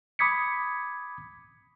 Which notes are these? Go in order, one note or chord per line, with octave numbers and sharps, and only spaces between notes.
B5 D6 D#6 G#6 B6 C#7